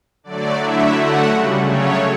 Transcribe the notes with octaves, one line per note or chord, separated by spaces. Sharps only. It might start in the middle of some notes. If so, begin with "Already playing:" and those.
D3 F#3 A3 D5
D3 F#3 A3 E4 E5
D3 A3 F#4 F#5
C#3 G3
C#3 F#3 A3 C#5